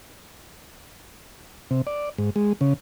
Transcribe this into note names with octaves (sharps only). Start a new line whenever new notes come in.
C3
D5
G#2
G#3
C#3